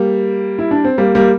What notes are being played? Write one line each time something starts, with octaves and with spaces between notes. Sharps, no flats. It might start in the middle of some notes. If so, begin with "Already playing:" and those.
Already playing: G3 A#3
E4
D4
C4
G3 A#3
G3 A#3